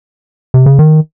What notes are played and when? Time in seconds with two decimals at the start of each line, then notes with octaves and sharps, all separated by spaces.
0.54 C3
0.66 C#3
0.79 D#3